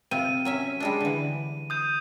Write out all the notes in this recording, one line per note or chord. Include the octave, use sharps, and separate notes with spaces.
C3 C4 F4 D#7
F#3 C#4 E5
G3 G#3 D4
D3 E3
D#6 G6 D#7